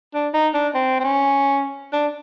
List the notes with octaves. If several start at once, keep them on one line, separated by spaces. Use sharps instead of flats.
D4
D#4
D4
C4
C4
C#4
D4